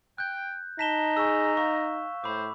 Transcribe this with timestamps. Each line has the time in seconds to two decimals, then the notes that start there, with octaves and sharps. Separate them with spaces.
0.18 G5 F#6 G6
0.79 D#4 A5 A#5 B6 E7 G7
1.17 G#4 G#5 C#6 E6
1.57 F5 C#6
2.24 A2 C5 B5 D6